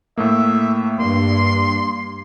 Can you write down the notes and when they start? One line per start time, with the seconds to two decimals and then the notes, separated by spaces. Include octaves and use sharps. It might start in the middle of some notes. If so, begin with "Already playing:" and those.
0.17 A2 A3 A#3 E5
0.99 G2 A#3 C6